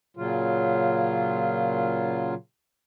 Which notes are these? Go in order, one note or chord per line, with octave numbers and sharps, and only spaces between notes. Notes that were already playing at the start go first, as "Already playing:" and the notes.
A#2 C#3 F#3 F4